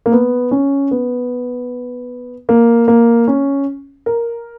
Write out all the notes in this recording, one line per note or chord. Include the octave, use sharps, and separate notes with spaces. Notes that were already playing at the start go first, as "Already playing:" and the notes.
A#3
B3
C#4
B3
A#3
A#3
C#4
A#4